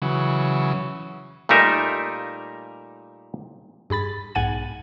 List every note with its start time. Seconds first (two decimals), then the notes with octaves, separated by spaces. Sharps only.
0.02 C#3 E3 F#3
1.49 A#2 G3 A3 D#4 A#4 E5
3.90 G2 G#4 B5 A6
4.35 B1 G#2 F#5 G#5 A6 D#7